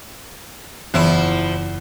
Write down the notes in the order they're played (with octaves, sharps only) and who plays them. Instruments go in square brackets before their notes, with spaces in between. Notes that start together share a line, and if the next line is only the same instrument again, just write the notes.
[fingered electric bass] F#1 [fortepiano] E2 [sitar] F3 E4